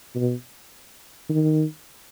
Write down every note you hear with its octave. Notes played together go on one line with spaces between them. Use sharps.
B2
D#3